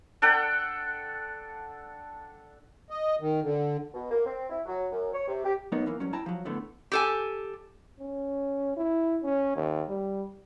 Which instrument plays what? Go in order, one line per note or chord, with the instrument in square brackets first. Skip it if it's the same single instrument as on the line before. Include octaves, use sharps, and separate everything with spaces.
[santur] D4 A4 F#5 G5
[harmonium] D#5
D#3
D3
[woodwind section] B2
A#3
C4
E4
F#3
F#2
C#5
C3
G4
[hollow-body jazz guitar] B1 F#2 A#3 B3 D#4 C#5
E3 A#3
G2 F#3 C#4
E4 G5 A5 A#5
F3 F#3
A2 D3 A3 B3
[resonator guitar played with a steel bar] G4 A4 G#5
[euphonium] C#4
E4
C#4
D#2
G3